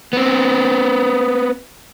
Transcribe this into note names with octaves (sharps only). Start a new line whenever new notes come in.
B3 C4